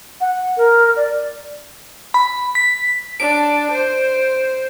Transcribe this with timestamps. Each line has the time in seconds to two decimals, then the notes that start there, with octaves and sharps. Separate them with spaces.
0.21 F#5
0.57 A#4
0.96 D5
2.14 B5
2.55 B6
3.20 D4 D7
3.71 C5